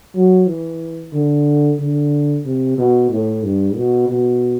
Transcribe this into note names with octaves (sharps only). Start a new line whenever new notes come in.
F#3
E3
D3
D3
C3
B2
A2
G2
B2
B2